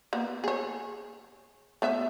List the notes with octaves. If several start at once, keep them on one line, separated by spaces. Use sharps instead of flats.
A#3 B3
G#4 C#5
A3 B3 E5